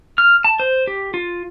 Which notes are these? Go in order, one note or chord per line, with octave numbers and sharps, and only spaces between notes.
F6
A5
C5
G4
F4